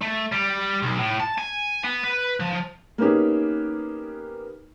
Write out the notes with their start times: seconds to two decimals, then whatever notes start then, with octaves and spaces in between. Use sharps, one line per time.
0.02 A3
0.32 G3
0.82 B1
0.98 A2
1.20 A5
1.38 G#5
1.84 B3
2.04 B4
2.40 F3
2.98 A#3 B3 C#4 D#4 G4 G#4